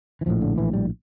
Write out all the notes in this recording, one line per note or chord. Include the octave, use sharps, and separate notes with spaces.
E3
A#1 A2 F3
D3
E3
G3